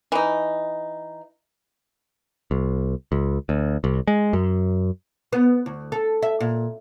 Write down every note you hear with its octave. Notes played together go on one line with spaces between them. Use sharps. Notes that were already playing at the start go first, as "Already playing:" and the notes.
E3 D#4
C2
C#2
D2
C2
G#3
F#2
B3
D2
A4
E5
A#2